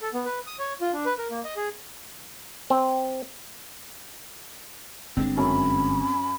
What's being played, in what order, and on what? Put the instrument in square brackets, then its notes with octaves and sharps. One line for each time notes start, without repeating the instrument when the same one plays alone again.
[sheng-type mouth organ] A4
B3
B4
D#6
C#5
F4
D4
B4
A#4
A#3
D#5
G#4
[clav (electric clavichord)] C4
[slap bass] G1 G#3 D4 [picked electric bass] C4
[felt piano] F#2 C#4 [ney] B5